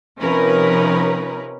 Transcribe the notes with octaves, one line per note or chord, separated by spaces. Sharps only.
C3 F3 C#4 D#4 A#4 B4